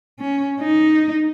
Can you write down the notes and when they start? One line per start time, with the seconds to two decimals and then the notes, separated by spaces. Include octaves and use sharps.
0.19 C#4
0.60 D#4